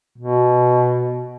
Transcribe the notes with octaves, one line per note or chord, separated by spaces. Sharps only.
B2